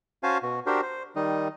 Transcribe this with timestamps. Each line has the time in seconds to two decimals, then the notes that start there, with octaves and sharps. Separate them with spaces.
0.23 C#4 F#4 C5 F5 G#5 A5
0.43 B2 F#4
0.67 D4 F#4 G4 A#4 C5
0.82 C5
1.16 D#3 G3 D#4